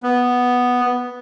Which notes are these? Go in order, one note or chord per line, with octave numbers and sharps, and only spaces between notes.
B3